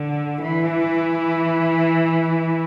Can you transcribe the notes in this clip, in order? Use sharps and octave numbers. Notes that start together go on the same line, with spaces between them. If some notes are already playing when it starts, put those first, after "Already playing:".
Already playing: D3
E3